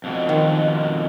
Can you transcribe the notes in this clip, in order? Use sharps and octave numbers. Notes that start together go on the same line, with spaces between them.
F2 B2
D#3